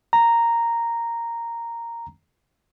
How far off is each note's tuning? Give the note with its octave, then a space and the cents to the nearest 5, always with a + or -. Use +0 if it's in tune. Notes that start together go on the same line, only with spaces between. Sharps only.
A#5 -5